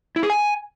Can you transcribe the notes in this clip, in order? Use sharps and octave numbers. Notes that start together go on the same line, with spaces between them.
E4
G#4
G#5